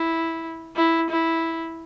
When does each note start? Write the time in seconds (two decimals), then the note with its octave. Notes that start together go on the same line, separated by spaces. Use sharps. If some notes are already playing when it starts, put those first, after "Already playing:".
Already playing: E4
0.76 E4
1.10 E4